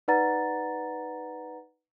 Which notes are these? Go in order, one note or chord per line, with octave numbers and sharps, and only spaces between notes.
D#4 B4 D5 F#5 A#5 A6